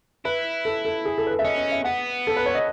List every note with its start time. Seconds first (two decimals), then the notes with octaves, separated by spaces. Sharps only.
0.25 E4 B4
0.65 A4
0.85 A4
1.05 G#4
1.18 A4
1.27 B4
1.31 A4
1.39 E5
1.45 C#4 D#5
1.58 D#5
1.72 E5
1.84 B3 F#5
2.27 A4
2.37 B4
2.46 C#5
2.55 D#5